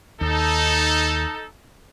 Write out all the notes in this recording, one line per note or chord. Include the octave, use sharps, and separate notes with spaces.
D#2 D#4 A4